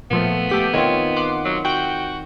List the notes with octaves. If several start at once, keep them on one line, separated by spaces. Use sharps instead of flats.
A#2 F3 A3 B3
A3 G4 B6
D#3 C4 F4 C#5
F#5 C6 D6
F#3
F#4 G5